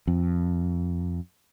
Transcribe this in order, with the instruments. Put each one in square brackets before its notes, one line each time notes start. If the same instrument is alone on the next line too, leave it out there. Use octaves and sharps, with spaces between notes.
[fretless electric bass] F2